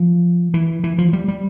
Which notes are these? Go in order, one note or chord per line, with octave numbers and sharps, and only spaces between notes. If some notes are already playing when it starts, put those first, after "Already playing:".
Already playing: F3
E3
E3
F3
G3
G3